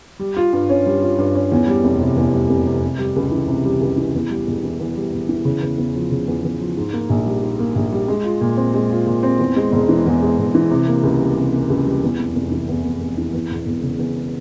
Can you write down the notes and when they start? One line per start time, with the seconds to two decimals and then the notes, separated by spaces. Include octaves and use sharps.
0.19 G3
0.37 F4
0.53 G2
0.69 C#4
0.86 G3
1.02 F4
1.19 G2
1.35 C#4
1.52 E2
1.67 G3
1.84 F1
2.01 C3
2.16 E2
2.33 G3
2.49 F1
2.67 C3
2.82 C3
2.99 G3
3.16 C#2
3.32 E3
3.48 C3
3.65 G3
3.81 C#2
3.97 E3
4.15 E2
4.30 G3
4.47 E1
4.63 E3
4.79 E2
4.96 G3
5.13 E1
5.29 E3
5.45 C#3
5.62 E2
5.78 E2
5.95 F3
6.11 C#3
6.28 E2
6.44 E2
6.61 F3
6.77 G#2
6.93 A#3
7.10 A#1
7.26 G3
7.42 G#2
7.59 A#3
7.76 A#1
7.92 G3
8.08 G#3
8.24 F4
8.41 A#2
8.57 C4
8.74 G#3
8.91 F4
9.07 A#2
9.23 C4
9.40 E2
9.56 G#3
9.72 E1
9.89 E3
10.06 E2
10.22 G#3
10.39 E1
10.55 E3
10.71 C3
10.88 A#3
11.03 C#2
11.20 G3
11.36 C3
11.54 A#3
11.70 C#2
11.86 G3
12.03 E2
12.19 F1
12.36 F1
12.51 E3
12.68 E2
12.85 F1
13.00 F1
13.18 E3
13.33 E2
13.51 E1
13.66 E1
13.83 C#3
13.99 E2